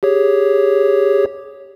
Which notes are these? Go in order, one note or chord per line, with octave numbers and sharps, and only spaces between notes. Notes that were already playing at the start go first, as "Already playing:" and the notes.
G4 G#4 C#5